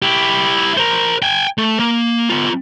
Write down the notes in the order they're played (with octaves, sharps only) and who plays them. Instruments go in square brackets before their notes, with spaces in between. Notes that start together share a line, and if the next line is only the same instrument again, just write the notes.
[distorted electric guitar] E4 G4
A#4 C5
G5 G#5
A3
A#3
B3 F4